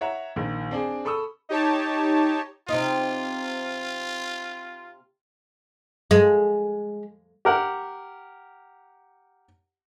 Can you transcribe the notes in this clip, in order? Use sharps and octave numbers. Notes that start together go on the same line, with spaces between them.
C#5 E5 F#5 A#5
A#1 D#3
C4 D4 G#4
A4 B5 C#6 D#6 E6
D#4 G4 C#5 A5
C3 D#4 F4
G#3
G4 A#4 F#5